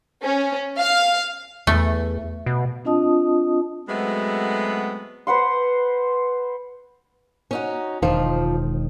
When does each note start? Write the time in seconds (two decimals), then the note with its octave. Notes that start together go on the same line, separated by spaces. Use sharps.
0.22 C#4
0.77 F5
1.67 E2 A3
2.46 B2
2.85 C4 D4 F4 D#5 A5 D#6
3.88 F#3 G#3 A3 B3 C4 F#4
5.27 B4 C5 F#5 C6
7.51 C#4 D#4 F#4
8.02 E1 G#2 D#3 F3